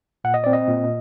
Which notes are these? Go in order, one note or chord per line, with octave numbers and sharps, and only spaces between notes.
A#2 F#5
D#5
C4 D5
D#5
A#2